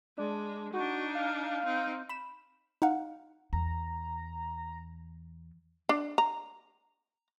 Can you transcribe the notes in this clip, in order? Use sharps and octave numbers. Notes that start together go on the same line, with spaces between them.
G#3 D4
D4 D#4 F#4
F5
C4 D#4
B5 E7
D#4 F5 F#5
E2 A#5
D4
A#5